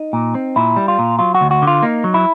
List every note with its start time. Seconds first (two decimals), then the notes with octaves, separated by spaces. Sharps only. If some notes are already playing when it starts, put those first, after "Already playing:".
Already playing: D#4
0.13 A#2
0.35 C4
0.56 A#2 E4
0.76 G3
0.88 F4
0.99 A#2
1.19 F#3 F4
1.35 F#4
1.41 D2
1.51 F#4
1.62 D3
1.67 F4
1.82 A#3 D#4
2.04 F#3
2.14 E4